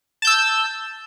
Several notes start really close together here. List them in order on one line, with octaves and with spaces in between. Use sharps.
A5 G6 E6